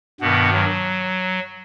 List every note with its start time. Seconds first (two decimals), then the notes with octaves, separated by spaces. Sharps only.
0.20 G2 B2 D#3 B3
0.53 F#3